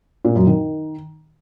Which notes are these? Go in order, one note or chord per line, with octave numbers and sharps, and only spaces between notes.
A#2
F#2
D#3